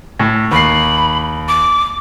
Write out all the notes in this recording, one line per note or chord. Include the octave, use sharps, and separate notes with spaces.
A2
D#2 B5 C7
D6